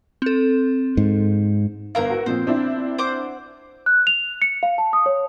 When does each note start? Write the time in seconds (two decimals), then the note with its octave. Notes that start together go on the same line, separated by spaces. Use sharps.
0.22 C4 A4
0.97 G#2
1.95 G1 E4 A#4 F5 E6
2.10 F#4
2.26 A#2 F3 C4 C5
2.47 C4 D4 E4
2.98 C5 F#5 D6
3.86 F#6
4.07 F7
4.42 C#7
4.63 F5
4.78 A5
4.93 D#6
5.06 C#5